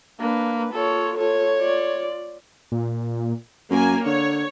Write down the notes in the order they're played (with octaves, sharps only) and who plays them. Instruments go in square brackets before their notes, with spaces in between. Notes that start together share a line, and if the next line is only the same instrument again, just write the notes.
[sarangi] A#3 [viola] D4 B4
[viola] F4 C#5 [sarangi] A4
[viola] F4 A4 [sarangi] C#5
[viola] F4 D5
[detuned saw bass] A#2
[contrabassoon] F#2 [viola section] A#3 G#5
[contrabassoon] D3 [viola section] C#5